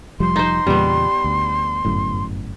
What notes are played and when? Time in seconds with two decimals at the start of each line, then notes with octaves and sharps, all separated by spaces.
0.20 F1 F3 G3 C6
0.36 D#4 C5
0.67 E2 A#2 C#3 G3 B3
1.24 D2
1.85 G1 F#2 A2